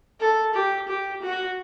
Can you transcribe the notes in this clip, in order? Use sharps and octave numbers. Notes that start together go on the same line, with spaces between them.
A4
G4
G4
F#4